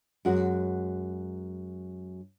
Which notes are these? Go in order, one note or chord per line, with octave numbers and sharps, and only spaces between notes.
F#2 G#3 F#4